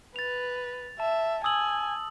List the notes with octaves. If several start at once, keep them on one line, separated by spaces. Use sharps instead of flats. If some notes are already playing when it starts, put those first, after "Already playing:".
B4 A6 F7
E5 A5
G#5 D#6 E6 F#7